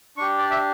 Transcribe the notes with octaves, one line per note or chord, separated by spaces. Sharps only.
D4 G4 C#6
D5
E5